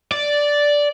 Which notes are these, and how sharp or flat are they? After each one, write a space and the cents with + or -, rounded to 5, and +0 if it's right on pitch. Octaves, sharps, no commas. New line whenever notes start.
D5 -5